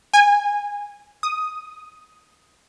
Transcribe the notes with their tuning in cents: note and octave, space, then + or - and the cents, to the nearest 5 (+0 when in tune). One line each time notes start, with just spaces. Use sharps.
G#5 -20
D#6 +5